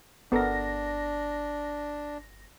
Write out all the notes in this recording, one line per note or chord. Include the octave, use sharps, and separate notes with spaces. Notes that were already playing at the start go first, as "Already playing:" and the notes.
G1 B3 D4 A4 A#4 A#6